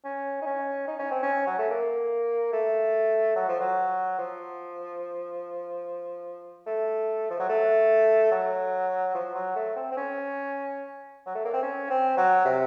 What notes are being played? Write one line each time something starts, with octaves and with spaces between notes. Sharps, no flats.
C#4
D#4
C#4
D#4
C#4
C4
C#4
F#3
A3
A#3
A3
F#3
F3
F#3
F3
A3
F3
F#3
A3
F#3
F3
F#3
A3
C4
C4
C#4
F#3
A3
A#3
C4
C#4
C4
F#3
C3